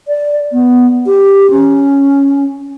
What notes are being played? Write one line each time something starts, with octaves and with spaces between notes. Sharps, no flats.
D5
B3
G4
C#4